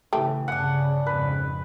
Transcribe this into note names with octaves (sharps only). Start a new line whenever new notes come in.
A2 C#3 E3 A3 G4
G1 C#3 D4 F#5 G#5
G#1 F2 C#3 B4